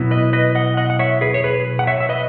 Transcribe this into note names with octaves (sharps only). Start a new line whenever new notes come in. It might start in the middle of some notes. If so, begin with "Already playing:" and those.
Already playing: B2 F#3 B3 E4
B4 D#5
B4 D#5
D#5 F#5
D#5 F#5
F#5
C#5 E5
G#4 B4
C#5
G#4 B4
F#5
C#5 E5
E5
B4 D#5